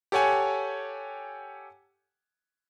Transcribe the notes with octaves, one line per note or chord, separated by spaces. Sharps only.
G4 A4 C#5 F#5 G#5